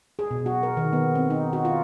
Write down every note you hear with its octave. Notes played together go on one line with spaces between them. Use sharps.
G#4
B2
F#4
A#4
D#3
B3
C4
D#4
F#4
F4